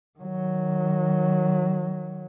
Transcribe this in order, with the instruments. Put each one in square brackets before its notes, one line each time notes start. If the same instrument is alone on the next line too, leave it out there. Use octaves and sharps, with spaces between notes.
[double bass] D#3 F#3